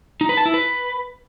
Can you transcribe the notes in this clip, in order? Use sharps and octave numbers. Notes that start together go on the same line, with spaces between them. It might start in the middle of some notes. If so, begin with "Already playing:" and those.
D#4
B4
A5
E4
B4